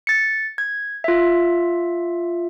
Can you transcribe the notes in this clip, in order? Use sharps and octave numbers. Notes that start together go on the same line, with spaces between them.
A6 C#7
G#6
F4 E5